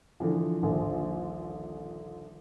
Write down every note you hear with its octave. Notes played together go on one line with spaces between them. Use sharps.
D3 E3 F3
D#1 A#1 D3